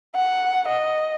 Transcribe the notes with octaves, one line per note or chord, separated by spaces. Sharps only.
F#5
D#5